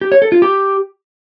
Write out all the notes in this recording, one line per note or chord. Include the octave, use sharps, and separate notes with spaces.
G4
C#5
A4
F4
G4